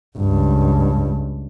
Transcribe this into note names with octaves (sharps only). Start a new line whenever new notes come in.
C#2 G2